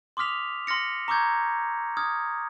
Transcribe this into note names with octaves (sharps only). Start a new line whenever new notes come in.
C6 D6 D#6 F6 B6 F7
C6 F6 A#6 C#7
A#5 C#6 D6 E6 G6 G#6
D#6 F6 G#6